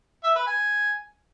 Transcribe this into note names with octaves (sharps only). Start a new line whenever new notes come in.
E5
B4
G#5